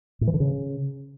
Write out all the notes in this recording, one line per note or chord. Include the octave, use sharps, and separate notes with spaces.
A2
E3
D3
C#3